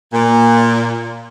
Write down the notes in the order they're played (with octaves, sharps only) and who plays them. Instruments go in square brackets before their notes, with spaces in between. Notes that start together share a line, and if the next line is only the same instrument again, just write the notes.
[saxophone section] A#2